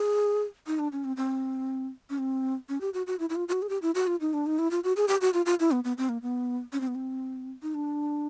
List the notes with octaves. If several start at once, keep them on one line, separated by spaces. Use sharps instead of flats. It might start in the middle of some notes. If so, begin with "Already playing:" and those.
Already playing: G#4
D#4
D4
C#4
C4
C4
C#4
C4
C#4
G4
F#4
F#4
E4
E4
F4
F4
F#4
G#4
G4
E4
F#4
F4
D#4
D4
D#4
E4
F4
F#4
G#4
G4
F#4
F4
F4
E4
B3
B3
C4
A#3
B3
C#4
C4
B3
C4
D#4
D4